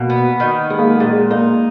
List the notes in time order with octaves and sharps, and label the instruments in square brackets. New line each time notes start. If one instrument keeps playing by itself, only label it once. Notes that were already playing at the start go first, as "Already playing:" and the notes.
Already playing: [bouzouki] B2 [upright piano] A#3
[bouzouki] B3
D#3
[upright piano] G#3 [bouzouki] B3
[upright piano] A#3
G#3
[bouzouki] A#2 [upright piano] A#3
[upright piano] G#3
[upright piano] A#3 [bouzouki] D#4